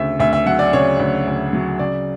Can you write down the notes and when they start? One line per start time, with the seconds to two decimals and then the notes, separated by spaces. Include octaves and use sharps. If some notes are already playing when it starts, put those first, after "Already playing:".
Already playing: D2 C#3 E5
0.20 D2 E5
0.33 E5
0.46 F#3 F#5
0.59 D5
0.73 C#3 C#5
0.99 D2
1.27 D2
1.53 F#3
1.79 C#3 D5